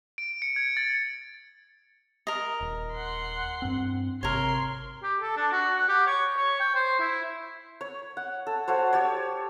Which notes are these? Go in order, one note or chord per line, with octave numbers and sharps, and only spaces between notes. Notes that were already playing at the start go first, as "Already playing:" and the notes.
D7
C#7
G#6
A6
A#4 D#5
D#1
F#5 C6
G2 C4
G#1 C3 A#4 C#5 C6
G4
A4
D4
F#4
F#5
G4
C#5
C#5
G5
C5
E4
C#5
F#5
A4
F#4 A4 C5 C#5
G4 C#5